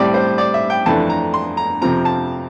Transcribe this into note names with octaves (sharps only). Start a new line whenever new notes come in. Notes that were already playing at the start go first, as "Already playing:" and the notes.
Already playing: A2 G3 C4 D5
C5
D5
E5
G5
F2 E3 A3 D4 A5
A#5
C6
A#5
F2 C3 F3 C4 A#5
A5